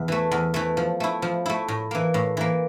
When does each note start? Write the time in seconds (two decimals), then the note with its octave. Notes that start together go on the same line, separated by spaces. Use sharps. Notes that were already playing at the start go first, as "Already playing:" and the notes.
Already playing: E2
0.08 E3 A3
0.31 E2
0.54 E3 A3
0.77 F3
1.00 A3 E4
1.22 F3
1.46 A3 E4
1.68 A2
1.91 E3 A#3
2.14 A2
2.37 E3 A#3